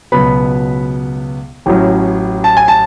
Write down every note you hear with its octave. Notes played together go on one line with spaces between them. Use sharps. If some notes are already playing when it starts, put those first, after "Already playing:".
C#2 B2 F#3 B3 B5
A1 A2 F#3 C#4
A5
G#5
A5